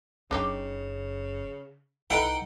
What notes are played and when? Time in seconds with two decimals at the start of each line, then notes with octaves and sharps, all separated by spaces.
0.31 F#1 F#2 C#3 D4 D#4 G4
2.10 C2 D#4 E4 A4 B4 F#5 G5